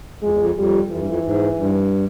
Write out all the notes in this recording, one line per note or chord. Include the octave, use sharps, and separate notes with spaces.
F2 G#3
E2
F2
F2 G3
F2 E3
G2
F2
G#2
G2